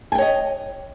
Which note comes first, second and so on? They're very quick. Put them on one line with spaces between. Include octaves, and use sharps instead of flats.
G#5 G5 C#5 D#5